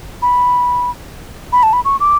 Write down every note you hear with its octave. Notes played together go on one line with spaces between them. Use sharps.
B5
B5
A5
B5
C#6
D6